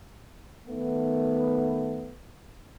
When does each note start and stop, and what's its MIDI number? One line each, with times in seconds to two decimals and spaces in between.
0.68 2.15 51
0.68 2.15 57
0.68 2.15 59